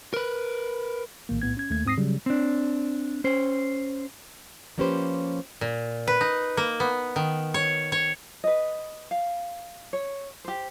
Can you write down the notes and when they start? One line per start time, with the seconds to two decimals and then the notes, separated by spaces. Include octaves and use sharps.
0.14 A#4 B4
1.29 A#1 A2 D#3 A#3
1.42 B1 A2 B3 G#6
1.57 C#4 G#6
1.70 D#2 A3 A#3 G#6
1.86 G#2 C4 D#6 A#6 C7
1.98 C#3 F#3 G3
2.26 C4 D4
3.24 C#4 C5
4.78 F3 A#3 C#4 G4 B4 C5
5.61 A#2
6.07 B4
6.21 D#4
6.57 A#3
6.80 B3
7.16 D#3
7.54 C#5
7.92 C#5
8.44 B4 D#5
9.11 F5
9.93 C#5
10.45 G4 C5